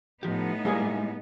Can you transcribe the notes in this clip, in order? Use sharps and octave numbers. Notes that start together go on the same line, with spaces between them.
A2 F3 B3 D#4 G4
G3 G#3 A#3 E4 G#4 G#5